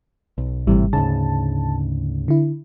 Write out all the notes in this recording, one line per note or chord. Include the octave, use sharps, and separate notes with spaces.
B1
G#1 A2 C3 E3 G3
D2 G#2 C#3 A5
D3 E4